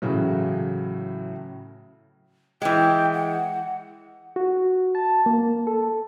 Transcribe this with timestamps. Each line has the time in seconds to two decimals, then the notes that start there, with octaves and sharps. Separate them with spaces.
0.02 A2 C#3 E3 F#3
2.62 E3 G#3 G5
3.13 F#5
4.36 F#4
4.95 A5
5.26 A#3
5.67 A4